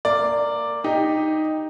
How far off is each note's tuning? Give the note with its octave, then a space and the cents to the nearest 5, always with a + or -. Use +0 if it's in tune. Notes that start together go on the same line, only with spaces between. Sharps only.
A#3 -20 D5 +0
D#4 +0 G4 +10 D#5 +0